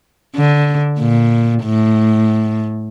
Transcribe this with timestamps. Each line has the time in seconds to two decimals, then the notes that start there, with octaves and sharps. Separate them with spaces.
0.36 D3
0.99 A#2
1.64 A2